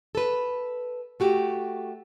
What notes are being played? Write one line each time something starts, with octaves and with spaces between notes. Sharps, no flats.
A4 B4
A3 F#4 G4